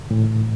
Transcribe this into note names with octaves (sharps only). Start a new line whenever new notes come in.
A2